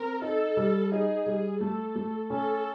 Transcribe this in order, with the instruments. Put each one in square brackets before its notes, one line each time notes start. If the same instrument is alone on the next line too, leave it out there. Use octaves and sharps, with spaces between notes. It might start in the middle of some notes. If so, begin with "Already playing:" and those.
Already playing: [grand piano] C4 [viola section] A#4
[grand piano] D#4 [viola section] A4
[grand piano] G3
[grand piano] D#4 [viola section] G#4
[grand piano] G3
[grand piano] A3 [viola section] A4
[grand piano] A3
[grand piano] C#4 [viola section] A4